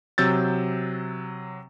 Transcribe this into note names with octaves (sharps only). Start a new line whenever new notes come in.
C3 F#3 E6 G6 A6